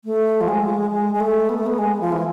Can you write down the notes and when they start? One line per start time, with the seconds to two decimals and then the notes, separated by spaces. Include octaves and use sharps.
0.05 A3
0.41 F3
0.48 G#3
0.91 G#3
1.15 G#3
1.20 A3
1.49 B3
1.58 A3
1.66 B3
1.78 G#3
2.01 F3
2.12 E3